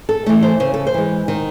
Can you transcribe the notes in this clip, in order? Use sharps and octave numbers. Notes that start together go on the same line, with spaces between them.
A4
E3 A3 A4
C5
C#3 C5
A4
C5
E3 G#3
D#3